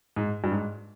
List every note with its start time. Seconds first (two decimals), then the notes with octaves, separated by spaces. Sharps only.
0.16 G#2
0.44 G2
0.52 G#2